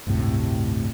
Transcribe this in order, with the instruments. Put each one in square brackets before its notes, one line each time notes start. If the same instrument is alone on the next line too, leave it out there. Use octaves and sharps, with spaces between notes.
[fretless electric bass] G1 D2 A2 C3